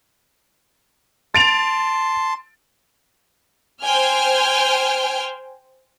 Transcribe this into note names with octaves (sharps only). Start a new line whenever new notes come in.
A5 C6 A6 D7 F7
C5 G5 G#5 F6